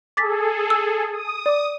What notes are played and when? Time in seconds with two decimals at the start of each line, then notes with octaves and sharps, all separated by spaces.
0.17 G#4 A4 D6 A6 B6
0.70 E6
1.11 D#6
1.46 D5 D6